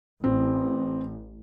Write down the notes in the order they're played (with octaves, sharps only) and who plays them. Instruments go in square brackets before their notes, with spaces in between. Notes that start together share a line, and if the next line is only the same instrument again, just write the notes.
[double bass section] A1 [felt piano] C4